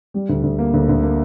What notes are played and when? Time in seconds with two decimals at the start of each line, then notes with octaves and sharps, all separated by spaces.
0.14 G3
0.29 D2
0.43 D2
0.59 A#3
0.74 D2
0.89 D2
1.03 A#3